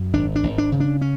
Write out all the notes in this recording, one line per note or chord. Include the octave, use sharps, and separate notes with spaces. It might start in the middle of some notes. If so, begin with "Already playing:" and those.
Already playing: F#2
G#1 D4
D4
G#1
D4
C#3
D4
C#4